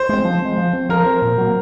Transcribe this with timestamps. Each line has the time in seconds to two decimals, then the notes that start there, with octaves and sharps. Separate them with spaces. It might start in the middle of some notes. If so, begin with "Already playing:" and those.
Already playing: C5
0.09 G#3 C4
0.25 F3
0.42 G#3 C4
0.57 F3
0.73 C4
0.89 F3 A#4
1.06 C4
1.22 A#2
1.38 F#3 A#3